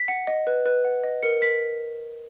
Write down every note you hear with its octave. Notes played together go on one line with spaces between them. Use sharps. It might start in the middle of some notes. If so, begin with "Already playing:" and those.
Already playing: B6
F#5
D#5
B4
B4
F#5
D#5
A#4 C#7
A#4 B6